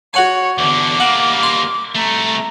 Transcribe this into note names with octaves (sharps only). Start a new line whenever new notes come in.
F#4 C#5 F#5 G#5
E2 D3 D6
G3 A#3 F#5
C6
C2 A3 A#5